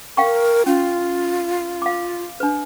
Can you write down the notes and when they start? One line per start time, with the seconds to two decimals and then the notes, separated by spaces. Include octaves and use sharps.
0.17 A#4 F5 G5 C#6
0.66 C#4 F4
1.82 F5 D6
2.40 D4 B4